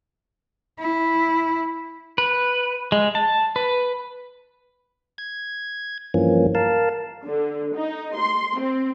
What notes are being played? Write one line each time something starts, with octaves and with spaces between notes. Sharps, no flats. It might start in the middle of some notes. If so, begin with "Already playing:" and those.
E4
B4
G#3
A5
B4
G#6
G2 E3 F3 A#3 C#4
A#4 F5 A5
D3
D#4
C6
C4